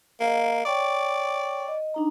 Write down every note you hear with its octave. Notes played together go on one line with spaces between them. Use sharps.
A#3 D#5 F5 A#5
C#5 D5 G5 C#6
D#5
D4 D#4 A#5